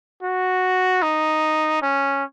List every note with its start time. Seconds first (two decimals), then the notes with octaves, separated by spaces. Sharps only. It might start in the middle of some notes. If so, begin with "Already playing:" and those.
0.23 F#4
1.02 D#4
1.82 C#4